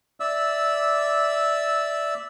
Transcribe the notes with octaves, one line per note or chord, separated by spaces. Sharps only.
D5 E5 E6